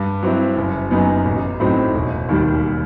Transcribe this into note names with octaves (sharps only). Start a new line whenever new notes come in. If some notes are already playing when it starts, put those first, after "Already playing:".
Already playing: G2
F#3 C4 E4
F#1
F#2 F#3 B3 D#4
A1
A2 F#3 C4 D#4
E1
D#2 D#3 G3